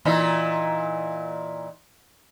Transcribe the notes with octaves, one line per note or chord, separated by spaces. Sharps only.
A#2 E3 D#4